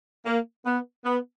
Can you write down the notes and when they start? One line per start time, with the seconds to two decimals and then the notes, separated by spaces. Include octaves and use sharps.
0.26 A#3
0.66 B3
1.05 B3